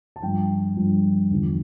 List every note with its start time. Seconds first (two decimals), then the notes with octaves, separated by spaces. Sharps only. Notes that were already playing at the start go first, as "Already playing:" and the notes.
0.16 A5
0.23 G2 F3 G5
0.77 G2 F3
1.31 E2 D3 F3